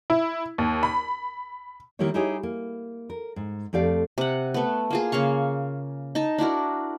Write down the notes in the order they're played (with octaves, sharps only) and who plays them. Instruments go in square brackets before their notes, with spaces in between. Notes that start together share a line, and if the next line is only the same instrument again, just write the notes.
[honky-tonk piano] E4
D#2
B5
[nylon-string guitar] D#3 G3 A#3 E4 G4 C#5
D#4 E4 G4 G#4 C#5 D#5
A#3
A#4
G#2
F2 A3 G4 D5 F5
[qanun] C3 F#5
A3 B3
A#3 F4 G#4
C#3 A#3 F5 C#6
D#4 A5
D4 E4 F#4 A#4